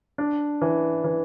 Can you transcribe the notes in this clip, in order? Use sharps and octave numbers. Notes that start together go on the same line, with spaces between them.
D4
E3
E3